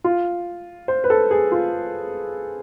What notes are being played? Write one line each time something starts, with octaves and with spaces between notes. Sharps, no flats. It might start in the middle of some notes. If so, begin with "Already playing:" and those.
F4
C5
B4
A4
G#4
F4